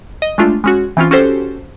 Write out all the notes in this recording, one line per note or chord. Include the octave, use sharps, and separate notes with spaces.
D#5
G#3 A3 D4 F4
G#3 C#4 F#4
E3 C4 C#4 F4
C#4 F#4 G4 A4 C5